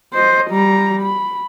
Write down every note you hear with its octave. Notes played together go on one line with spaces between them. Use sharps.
C5 D#5
G3 A#5
B5